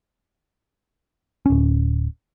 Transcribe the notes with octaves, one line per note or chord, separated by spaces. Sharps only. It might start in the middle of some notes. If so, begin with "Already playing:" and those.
D1 C#4